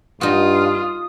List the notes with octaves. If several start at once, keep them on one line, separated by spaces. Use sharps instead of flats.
G2 D#4 F4 F#4 D#6